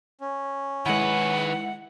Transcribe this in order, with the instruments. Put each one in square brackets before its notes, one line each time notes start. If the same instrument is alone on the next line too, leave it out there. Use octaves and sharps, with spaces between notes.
[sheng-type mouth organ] C#4
[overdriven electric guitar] D#3 B4 [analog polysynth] G#3 E4 [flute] F#5